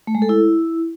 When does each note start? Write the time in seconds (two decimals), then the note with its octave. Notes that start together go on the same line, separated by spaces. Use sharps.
0.07 A3
0.15 G#3
0.22 A4
0.29 E4